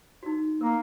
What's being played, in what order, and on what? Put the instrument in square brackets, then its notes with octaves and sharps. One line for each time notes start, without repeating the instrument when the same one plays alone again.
[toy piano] D#4 F#4
[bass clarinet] A#3 [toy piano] A#4